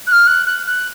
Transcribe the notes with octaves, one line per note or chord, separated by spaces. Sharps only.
F#6
F6
F#6
F#6
F#6